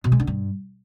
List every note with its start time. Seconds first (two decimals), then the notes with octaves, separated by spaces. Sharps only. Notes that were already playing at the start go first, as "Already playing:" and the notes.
0.04 B2
0.12 G#3
0.20 D3
0.27 G2